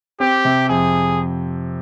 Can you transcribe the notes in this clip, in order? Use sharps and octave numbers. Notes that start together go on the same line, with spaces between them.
C4 G4
C3
F2 G#4